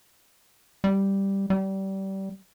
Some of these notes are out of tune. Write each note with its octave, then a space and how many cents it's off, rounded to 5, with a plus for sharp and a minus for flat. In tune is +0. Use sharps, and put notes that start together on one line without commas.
G3 +0
G3 -25